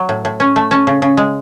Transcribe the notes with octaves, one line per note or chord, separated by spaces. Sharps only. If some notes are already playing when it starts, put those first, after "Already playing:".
Already playing: F#3
A2
A2
C#4
A3
C#4 A5
C#3
C#3
G#3